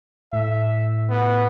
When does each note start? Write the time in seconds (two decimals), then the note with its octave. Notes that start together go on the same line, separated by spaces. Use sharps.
0.33 A2 E5
1.10 B3